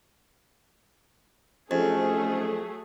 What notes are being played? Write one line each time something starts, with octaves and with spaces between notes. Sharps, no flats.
F2 G#2 C3 F#3 A3 C#4 G#4